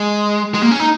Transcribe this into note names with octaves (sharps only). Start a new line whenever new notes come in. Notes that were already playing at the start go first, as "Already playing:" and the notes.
Already playing: G#3
G#3
A#3
C#4
D#4